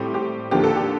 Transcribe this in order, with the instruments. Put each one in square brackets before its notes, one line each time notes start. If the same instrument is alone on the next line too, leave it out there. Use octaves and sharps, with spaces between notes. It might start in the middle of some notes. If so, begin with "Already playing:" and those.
Already playing: [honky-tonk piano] A2 G3 C4 G4
G4
D#2 D3 F3 A#3 G4
A4
G4